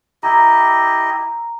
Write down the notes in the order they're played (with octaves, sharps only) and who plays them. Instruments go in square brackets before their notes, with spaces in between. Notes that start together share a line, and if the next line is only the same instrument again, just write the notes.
[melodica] E4 G4 D#5 [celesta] A#5